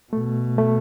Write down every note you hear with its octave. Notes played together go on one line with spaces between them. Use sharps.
B2 A3
A3